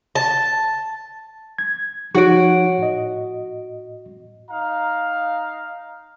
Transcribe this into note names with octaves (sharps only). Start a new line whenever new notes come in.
A5
G#6
F3 D#4 F#4 C#5 D7
A2 D#5
D#4 F5 A#5